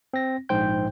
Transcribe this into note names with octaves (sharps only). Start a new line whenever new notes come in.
C4 A#6
A#1 G#2 C5 G5 G6